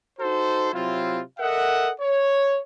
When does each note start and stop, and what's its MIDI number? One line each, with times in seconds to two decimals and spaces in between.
0.19 0.69 63
0.19 0.69 66
0.19 0.69 69
0.19 0.69 72
0.72 1.20 48
0.72 1.20 54
0.72 1.20 60
0.72 1.20 64
0.72 1.20 65
1.39 1.90 69
1.39 1.90 70
1.39 1.90 75
1.39 1.90 76
1.39 1.90 78
2.00 2.59 73